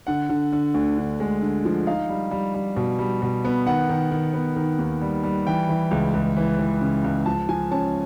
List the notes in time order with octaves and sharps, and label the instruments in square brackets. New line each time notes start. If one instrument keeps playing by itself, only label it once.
[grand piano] D3 F#5
D3
D3
D2
D3
G#3
D3
F3
D#4 F5
G3
G3
G3
B2
G3
B2
B3
D#3 F#5
D#3
D#3
B3
D#3
D#2
G3
G3
E3 G5
E3
C#2
C#2
E3
E3
C#3
C#2
F3 A5
F3 G#5
C#4 A5